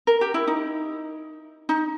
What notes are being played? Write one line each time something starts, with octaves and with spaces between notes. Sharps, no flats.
A#4
G4
E4
D#4
D#4